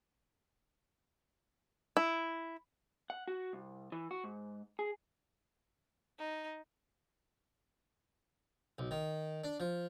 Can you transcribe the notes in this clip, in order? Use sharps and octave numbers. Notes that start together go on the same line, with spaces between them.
E4
F#5
F#4
C2
E3
F#4
G#2
G#4
D#4
B1
D#3
D4
F3